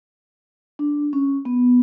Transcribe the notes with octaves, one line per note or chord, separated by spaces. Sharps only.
D4
C#4
B3